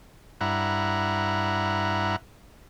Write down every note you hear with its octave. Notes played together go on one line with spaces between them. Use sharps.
G2 E4 F#5 A#5